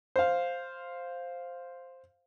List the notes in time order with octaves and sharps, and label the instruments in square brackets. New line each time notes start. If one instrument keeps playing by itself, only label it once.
[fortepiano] C5 F5